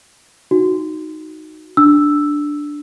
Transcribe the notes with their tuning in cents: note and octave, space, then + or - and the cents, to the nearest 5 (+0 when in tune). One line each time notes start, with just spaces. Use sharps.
D#4 +0 F#4 +0
D4 +0 E6 +0